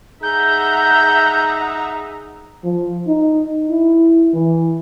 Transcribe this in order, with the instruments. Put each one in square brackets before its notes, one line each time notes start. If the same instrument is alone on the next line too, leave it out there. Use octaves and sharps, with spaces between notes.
[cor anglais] D#4 [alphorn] G#4 [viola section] E5 F#5 A#5 [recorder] G6
[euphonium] F3
D#4
E4
E3